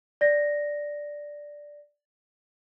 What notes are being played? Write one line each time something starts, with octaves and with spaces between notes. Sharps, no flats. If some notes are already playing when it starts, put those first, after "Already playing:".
D5 A#6